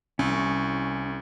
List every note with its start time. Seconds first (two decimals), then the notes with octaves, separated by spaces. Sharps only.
0.19 C2 C#4 C#6